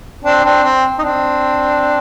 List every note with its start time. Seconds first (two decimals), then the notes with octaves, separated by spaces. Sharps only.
0.24 C4 D4
0.44 C4 D4
0.63 C4
0.98 D#4
1.03 C4 D4